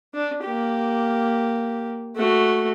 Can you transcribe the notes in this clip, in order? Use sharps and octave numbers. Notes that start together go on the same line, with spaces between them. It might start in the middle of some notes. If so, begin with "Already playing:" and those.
D4
A#3 G4
A3 F#4